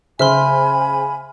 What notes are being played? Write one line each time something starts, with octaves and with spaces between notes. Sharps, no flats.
C#3 C5 E5 G#5 B5 C6 F6